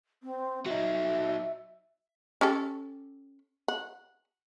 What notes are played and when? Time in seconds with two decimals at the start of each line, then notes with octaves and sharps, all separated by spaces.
0.23 C4
0.66 F#3 D#4 E5
2.41 C#4 G4 A4
3.68 F#5